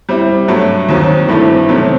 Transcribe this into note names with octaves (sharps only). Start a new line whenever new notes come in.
G3 C4 E4
G2 F#3 A3
D#2 D#3 F#3 C4
G2 E3 A3 C4
C3 D#3 F#3 A3 C4